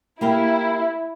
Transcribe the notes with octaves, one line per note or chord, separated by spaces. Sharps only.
A#3 E4 G4 A#4